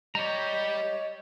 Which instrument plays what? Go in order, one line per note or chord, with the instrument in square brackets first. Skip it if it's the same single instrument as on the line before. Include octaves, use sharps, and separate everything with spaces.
[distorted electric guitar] G3 G4 [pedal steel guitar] C#5 A#5 [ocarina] D#5